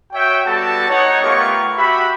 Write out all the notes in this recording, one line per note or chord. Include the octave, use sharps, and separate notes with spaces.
F#4 C#5 E5 G5
G3 B3 F#4 A4 A5
D#4 C#5 F#5
A3 B3 F4 G4 A#4 C#6
F#4 G4 E5 B5